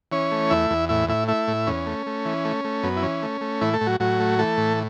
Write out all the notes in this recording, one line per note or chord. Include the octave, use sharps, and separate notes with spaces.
E3 C#4 C#5
A3
E2 E4 E5
E2
A2 E4 E5
A2 E4 E5
A3 E4 E5
A2
E2 C#4
A3
A3
E3
A3
A3
F#2 B3
E4
E3 C#4
A3
A3
A2 E3 E4
A3 A4
A2
F#3 F#4
A2 F#3 F#4
A3
E3 A3 A4
A2